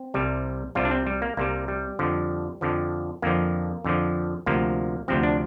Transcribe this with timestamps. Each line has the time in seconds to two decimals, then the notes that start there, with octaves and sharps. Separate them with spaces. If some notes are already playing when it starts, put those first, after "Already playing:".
Already playing: C4
0.14 C2 C3 G3
0.75 C2 C3 G3 F4
0.85 D4
0.91 C4
1.07 G3
1.22 A#3
1.37 C2 C3 G3 A#3
1.68 G3
1.99 F2 D3 F3
2.61 F2 D3 F3
3.22 F2 D3 F3 A#3
3.84 F2 D3 F3
4.46 D2 C3 F3 A#3
5.08 D2 C3 F3 C4
5.23 D4